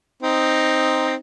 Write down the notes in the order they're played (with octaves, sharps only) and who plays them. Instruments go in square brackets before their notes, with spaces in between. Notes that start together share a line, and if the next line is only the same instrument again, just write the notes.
[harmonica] C4 D#4